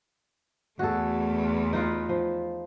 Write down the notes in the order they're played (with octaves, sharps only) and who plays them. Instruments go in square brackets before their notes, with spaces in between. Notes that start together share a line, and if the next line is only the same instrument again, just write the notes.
[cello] E2 A3 [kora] F#4 G#4 A4
[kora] D#4 F4 B4
F3